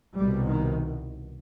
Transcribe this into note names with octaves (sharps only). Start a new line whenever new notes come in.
C2 B2 G3
D#3